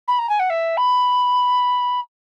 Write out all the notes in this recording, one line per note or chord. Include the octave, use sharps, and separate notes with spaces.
B5
A#5
G#5
F#5
E5
B5